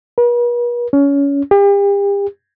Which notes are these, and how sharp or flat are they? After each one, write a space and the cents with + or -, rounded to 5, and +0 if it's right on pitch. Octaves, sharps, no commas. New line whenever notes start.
B4 -45
C#4 +25
G4 +40